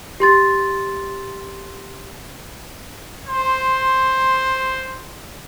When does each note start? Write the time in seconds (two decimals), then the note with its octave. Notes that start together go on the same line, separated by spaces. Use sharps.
0.20 G4 C6 A6
3.28 C5 C6